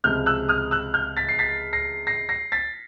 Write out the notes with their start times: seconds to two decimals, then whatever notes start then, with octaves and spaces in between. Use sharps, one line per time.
0.04 C#2 C3 F3 G#3 F6 G6
0.26 E6 F#6
0.49 D#6 F6
0.71 E6 F#6
0.94 F6 G6
1.17 A6 B6
1.29 C7
1.39 A6 B6
1.73 A#6 C7
2.07 A#6 C7
2.29 A#6 C7
2.52 A6 B6